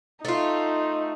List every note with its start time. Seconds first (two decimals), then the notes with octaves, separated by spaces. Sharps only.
0.25 A3 D#4 F4